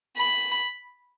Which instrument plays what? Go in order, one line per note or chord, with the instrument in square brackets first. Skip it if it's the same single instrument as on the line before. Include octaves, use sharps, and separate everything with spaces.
[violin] B5